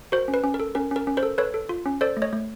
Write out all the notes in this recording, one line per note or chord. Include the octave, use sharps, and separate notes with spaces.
F#4 A#4 C5
C#4
B4
C#4
A#4
A4
C#4 A#4
C#4 A#4
C#4
A#4 C5
A4
A4 B4 C#5
A4
F4
C#4
A4 C5 D5
A3
C#5 D#5
A3